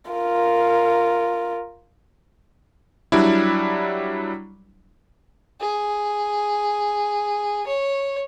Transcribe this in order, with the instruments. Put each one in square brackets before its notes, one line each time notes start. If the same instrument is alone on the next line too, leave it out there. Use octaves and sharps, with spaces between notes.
[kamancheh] F4 A#4
[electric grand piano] F#3 G3 D4 E4
[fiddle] G#4
C#5